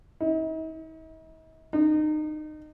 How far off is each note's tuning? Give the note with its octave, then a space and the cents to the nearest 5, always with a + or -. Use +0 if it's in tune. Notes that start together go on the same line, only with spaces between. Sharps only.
D#4 +45
D#4 -25